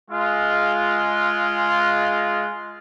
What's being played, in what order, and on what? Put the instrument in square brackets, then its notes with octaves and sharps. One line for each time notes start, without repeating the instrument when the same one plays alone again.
[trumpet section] G#3 F4